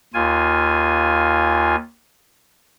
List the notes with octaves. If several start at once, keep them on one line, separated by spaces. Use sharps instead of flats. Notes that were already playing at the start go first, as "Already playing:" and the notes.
D#2 F4 G#5